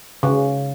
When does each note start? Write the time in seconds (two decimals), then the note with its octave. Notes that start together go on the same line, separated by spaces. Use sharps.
0.23 C#3